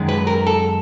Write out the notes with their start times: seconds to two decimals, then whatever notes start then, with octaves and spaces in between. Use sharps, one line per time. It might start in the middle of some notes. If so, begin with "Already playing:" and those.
Already playing: F#2 D#3 G#3
0.09 B4
0.27 A#4
0.47 A4